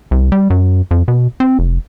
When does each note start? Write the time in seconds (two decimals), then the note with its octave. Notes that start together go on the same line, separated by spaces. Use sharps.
0.11 C2
0.32 G3
0.50 F#2
0.91 F2
1.08 B2
1.40 C4
1.59 F1